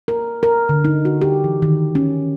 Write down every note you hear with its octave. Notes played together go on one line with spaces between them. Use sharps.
A#4
A#4
D3
D#4
F#4
G4
E3
D#3
C#4